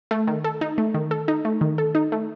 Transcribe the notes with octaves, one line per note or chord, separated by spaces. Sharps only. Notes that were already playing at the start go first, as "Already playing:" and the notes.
A3
D#3
A4
D#4
A3
D#3
A4
D#4
A3
D#3
A4
D#4
A3